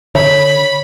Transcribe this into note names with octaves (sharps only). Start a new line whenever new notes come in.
D3 C#5 B5